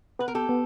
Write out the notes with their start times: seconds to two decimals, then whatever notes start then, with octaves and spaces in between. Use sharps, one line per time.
0.19 B3 B4
0.28 A#4
0.35 G4 A4
0.49 B3